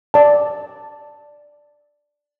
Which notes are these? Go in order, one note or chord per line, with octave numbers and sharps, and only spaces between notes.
D5 A5